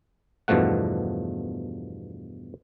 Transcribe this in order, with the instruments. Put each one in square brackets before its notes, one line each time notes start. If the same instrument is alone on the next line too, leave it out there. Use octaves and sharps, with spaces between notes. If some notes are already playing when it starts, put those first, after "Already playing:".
[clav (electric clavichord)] E2 G2 B2 F3 A3 F#5